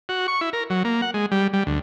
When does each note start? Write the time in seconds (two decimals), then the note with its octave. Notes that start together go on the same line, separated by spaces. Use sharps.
0.09 F#4
0.28 C#6
0.41 E4
0.53 A#4
0.70 F#3
0.84 A#3
1.02 F#5
1.14 G#3
1.31 G3
1.53 G3
1.67 D2